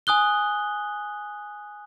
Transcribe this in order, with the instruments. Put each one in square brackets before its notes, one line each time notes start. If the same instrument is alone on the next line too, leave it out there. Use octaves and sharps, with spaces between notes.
[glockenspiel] G#5 D#6 F#6 G7